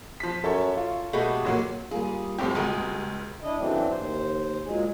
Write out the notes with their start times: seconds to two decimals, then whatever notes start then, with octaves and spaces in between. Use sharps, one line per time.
0.20 F3 B6
0.44 F#2 A4 C#5
0.77 F4
1.13 B2 G#3 A3 F#4 G4
1.45 A#2 F#3 A#3
1.91 G3 A#3 F4 G#4
2.38 A2 F3 F#3 C4 G4
2.55 C#2 F#4 G#4 A#4
3.43 D4 E4 D#5
3.58 C#3 E3 F#3 A3 C4 D4
3.88 D#2 C5
4.65 A#2 F#3 G#3 G#4